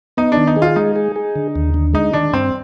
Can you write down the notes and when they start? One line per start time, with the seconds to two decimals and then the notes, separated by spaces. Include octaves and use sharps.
0.17 B3 D#4
0.32 D4
0.37 D#3
0.47 D#4
0.56 G#4
0.62 F4
0.76 G#3 D#4
0.96 G#4
1.16 G#4
1.36 D3
1.56 D#2
1.74 D3
1.94 G#3 D#4
2.13 D#3 D4
2.33 G2 C4